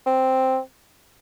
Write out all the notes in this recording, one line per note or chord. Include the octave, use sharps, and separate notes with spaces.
C4